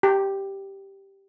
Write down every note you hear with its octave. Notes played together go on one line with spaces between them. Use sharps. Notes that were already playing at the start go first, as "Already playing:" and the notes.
G4